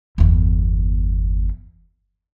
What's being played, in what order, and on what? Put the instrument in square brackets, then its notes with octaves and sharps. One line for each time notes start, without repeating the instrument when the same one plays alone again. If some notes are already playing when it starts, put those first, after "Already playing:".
[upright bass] G1 E2